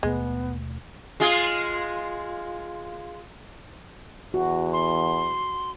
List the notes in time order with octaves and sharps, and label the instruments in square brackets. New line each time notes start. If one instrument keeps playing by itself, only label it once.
[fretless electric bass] D#2 B2 A3 [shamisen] G#3 [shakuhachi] B3
[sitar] G#3 F4 G#4
[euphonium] E2 [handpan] F#4
[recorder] C6